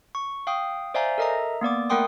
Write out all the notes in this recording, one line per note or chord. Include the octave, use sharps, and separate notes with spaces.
C#6
F5 G5 D#6
C5 D5 E5 F5 G#5 A#5
A4 A#4 D#5 E5 A#5
A#3 B3 D5 D6
A3 A#4 F#5 G5 C6 D#6